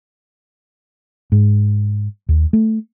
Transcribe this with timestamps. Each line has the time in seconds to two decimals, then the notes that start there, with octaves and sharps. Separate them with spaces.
1.32 G#2
2.29 D#2
2.53 A3